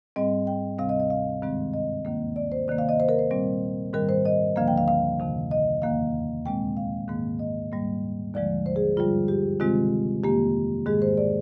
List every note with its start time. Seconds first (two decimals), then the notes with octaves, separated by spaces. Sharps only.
0.16 G#2 G3 C4 D#5
0.47 G5
0.78 D2 C3 G3 C4 F5
0.89 D#5
1.00 D#5
1.10 F5
1.42 G2 D#3 G#3 C4
1.74 D#5
2.05 D#2 D#3 A#3
2.36 D5
2.52 C5
2.68 C3 D#3 A#3 D5
2.78 F5
2.89 D#5
3.00 C5
3.09 A#4
3.19 C5
3.31 A#2 G3 C4
3.93 G#2 D#3 G3 A#4
4.09 C5
4.26 D#5
4.56 D2 D3 F3 A#3 F5
4.68 G5
4.78 F5
4.88 F5
5.20 F2 C3 D#3
5.51 D#5
5.82 D#2 D#3 A#3 F5
6.46 A#2 G#3 C4 G5
6.77 F5
7.08 G#2 D#3 A#3
7.39 D#5
7.72 G#2 G3 A#3
8.34 D#2 D3 F3 G#3 D5
8.66 C5
8.76 G#4
8.97 G2 D3 G3 F4
9.28 G4
9.60 C3 D#3 G#3 C4 F4
10.23 F2 D#3 A#3 G4
10.86 G#2 D#3 G#3 G#4
11.02 C5
11.17 D5